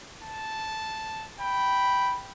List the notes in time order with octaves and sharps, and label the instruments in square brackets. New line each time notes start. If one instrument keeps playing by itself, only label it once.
[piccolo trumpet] A5
[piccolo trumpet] G5 [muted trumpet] B5